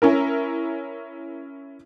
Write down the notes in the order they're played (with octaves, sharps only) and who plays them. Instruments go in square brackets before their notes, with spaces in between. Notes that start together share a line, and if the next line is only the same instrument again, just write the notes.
[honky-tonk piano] C#4 E4 A#4